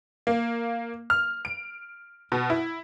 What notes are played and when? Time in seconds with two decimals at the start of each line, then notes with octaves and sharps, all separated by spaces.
0.27 A#3
1.10 F6
1.45 D7
2.32 B2
2.50 E4